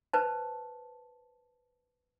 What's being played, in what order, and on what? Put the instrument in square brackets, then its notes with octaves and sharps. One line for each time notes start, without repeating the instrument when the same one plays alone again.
[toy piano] B4 C5 A5